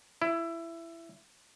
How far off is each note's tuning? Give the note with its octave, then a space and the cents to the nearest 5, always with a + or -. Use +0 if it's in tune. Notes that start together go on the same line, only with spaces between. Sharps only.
E4 +15